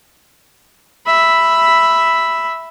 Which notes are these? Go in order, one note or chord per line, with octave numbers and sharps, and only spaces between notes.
E5 B5